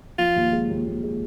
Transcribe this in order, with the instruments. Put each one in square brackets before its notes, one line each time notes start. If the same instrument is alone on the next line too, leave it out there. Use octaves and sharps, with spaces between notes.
[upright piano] F3 [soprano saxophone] F4
[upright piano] D#2
G#3
D#2
D#2
G#3